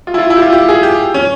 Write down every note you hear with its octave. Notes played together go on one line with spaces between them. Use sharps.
F4
E4
F4
E4
G4
F4
G4
G#4
G4
C#4